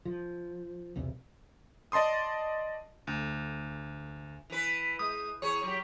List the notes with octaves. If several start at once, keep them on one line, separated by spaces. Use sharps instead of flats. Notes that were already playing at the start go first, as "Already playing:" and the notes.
F3
B1 E2 C3
D5 D#5 A5 C6 D#6
D2
E3 B4
G#3 D#6
E2 G#4 C#5 C#6
F#3 G4